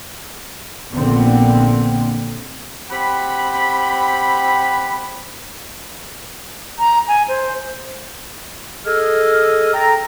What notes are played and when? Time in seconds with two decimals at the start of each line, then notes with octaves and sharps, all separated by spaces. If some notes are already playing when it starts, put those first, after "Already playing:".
0.94 A#1 A#2 D3 B3 C4
2.91 C4 G4 F#5 G5 B5
6.79 A#5
7.08 G#5
7.28 C5
8.86 G#4 A4 D#5 E6 F6
9.74 A4 G5 A#5